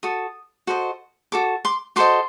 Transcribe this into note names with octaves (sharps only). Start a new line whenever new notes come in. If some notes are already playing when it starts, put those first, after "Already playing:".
F#4 A4 D#6
F#4 A4 C5 D#5
F#4 A4 D6
C6 D6
F#4 A4 C5 D#5 C6 D6